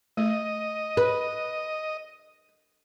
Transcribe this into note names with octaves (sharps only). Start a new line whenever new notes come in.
A3 D#5
B4